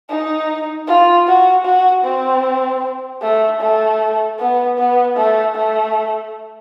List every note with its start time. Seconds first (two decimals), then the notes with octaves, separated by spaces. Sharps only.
0.10 D#4
0.87 F4
1.27 F#4
1.65 F#4
2.04 C4
3.22 A3
3.61 A3
4.39 B3
4.78 B3
5.17 A3
5.56 A3